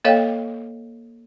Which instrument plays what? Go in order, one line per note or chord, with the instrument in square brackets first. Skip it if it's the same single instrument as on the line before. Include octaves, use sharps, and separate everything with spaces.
[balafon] A#3 A4 C#5 D#5 F5 G5